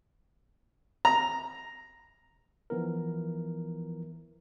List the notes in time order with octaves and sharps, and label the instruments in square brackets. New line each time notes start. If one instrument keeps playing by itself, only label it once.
[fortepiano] A#5
[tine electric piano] E3 F3 B3 E4 A#4